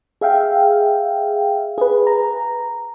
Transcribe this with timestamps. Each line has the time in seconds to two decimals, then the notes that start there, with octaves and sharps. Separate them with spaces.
0.21 G#4 E5 F5 G5
1.78 G#4 B4
2.07 A#5